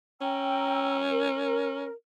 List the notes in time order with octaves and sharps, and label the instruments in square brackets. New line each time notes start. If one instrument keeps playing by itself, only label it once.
[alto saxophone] C#4 [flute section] G5 A#5 E6
[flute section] A#4